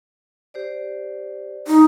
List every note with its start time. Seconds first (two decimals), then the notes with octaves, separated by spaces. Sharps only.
0.54 G4 C5 D5
1.67 D#4